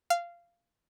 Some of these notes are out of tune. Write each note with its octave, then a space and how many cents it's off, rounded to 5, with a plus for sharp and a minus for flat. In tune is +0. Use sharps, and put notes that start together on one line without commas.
F5 -15